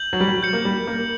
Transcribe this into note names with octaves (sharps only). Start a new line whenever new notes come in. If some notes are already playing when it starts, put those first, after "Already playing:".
Already playing: G6 F#7
F#3
G3
F#3
G6 C#7 F#7
A#3
G3
A#3